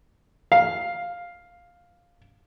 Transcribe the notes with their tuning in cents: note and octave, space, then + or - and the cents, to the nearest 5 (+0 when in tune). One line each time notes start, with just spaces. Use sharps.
F5 +5